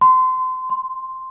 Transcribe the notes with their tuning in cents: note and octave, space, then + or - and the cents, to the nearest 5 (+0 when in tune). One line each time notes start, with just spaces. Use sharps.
C6 -30
C6 +0